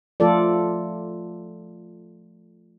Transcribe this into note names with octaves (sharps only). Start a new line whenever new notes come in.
F3 A3 F4 A4 D5